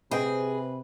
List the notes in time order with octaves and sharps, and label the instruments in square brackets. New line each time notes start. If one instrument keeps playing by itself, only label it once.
[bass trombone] C3 [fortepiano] C4 D#5 G5 [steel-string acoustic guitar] G#4 [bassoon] B4